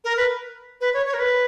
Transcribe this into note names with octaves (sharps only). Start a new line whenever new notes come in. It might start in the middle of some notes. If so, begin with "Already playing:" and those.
A#4
B4
B4
C#5
C#5
A#4
B4